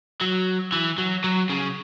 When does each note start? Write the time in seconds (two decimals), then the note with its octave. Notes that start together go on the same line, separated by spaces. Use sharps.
0.22 F#3
0.72 E3
0.98 F#3
1.24 F#3
1.49 C#3